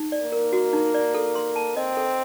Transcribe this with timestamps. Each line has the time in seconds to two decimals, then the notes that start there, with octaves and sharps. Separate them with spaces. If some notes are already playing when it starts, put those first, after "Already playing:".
Already playing: D#4
0.12 D5
0.22 A#3
0.32 A#4
0.53 F#4
0.73 D#4
0.94 D5
1.14 A4
1.35 C6
1.56 A5
1.76 C4 D#5
1.97 A4